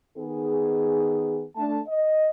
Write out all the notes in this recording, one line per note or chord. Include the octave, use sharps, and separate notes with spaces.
D#3 B3 D#4 G#4
A3 D4 A5
D#5